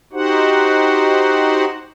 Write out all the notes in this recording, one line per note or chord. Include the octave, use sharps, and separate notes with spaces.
D#4 F#4 G4 C5 F#5